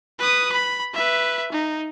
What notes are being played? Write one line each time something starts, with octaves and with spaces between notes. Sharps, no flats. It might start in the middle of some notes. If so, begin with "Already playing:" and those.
B4 D#6
B5
B4 E5
D#4